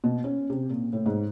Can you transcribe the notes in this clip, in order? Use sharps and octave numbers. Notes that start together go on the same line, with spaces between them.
B2
C#4
C3
A#2
A2
G#2